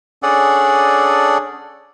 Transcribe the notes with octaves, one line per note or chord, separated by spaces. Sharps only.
C#4 D4 G#4 A4 D5 F#5